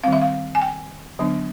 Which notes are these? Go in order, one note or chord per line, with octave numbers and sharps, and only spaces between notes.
D#3 G3 C4 F5
E5
F5
G#5
G5
D3 F#3 B3 D4